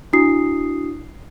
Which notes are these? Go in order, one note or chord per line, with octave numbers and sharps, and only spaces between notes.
D4 E4 F#4 D#6 C7